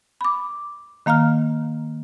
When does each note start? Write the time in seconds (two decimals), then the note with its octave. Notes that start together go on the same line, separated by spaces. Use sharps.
0.21 B5 D6
1.06 D#3 A#3 F5 A#5 F6